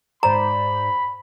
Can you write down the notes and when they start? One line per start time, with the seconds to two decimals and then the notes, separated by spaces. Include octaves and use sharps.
0.23 G#2 C5 D5 A#5 B5